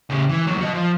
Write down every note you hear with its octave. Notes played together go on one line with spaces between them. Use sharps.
C#3 G4
E3
D#2 F#3
F#4 D#5
F3